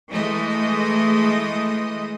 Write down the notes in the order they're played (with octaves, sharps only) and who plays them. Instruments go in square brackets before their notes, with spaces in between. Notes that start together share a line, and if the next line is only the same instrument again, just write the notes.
[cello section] E3 G#3 A3 D#5